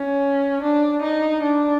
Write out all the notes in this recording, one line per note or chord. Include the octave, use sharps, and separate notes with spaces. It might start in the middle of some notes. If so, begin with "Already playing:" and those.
Already playing: C#4
D4
D#4
D4